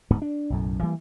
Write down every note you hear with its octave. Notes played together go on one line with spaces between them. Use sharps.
D1 G#2 B3
D4
B1 F#2 A2
E3 G3 A#3